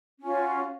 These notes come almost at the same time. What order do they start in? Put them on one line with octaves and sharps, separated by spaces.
C#4 F4 F#4